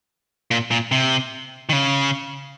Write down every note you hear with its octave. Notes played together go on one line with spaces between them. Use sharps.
A#2
A#2
C3
D#3
C#3